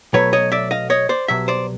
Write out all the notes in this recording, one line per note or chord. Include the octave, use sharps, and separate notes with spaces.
B1 B2 F#3 A3 B4 C#5
C#5 D#5
D5 E5
D#5 F5
C#5 D#5
C5 D5
C2 B2 F#3 E5
C5 D5